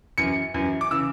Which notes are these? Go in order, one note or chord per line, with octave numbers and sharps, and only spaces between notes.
F#2 E3 C#7
F#2 E3
D6
C#3 E3 E6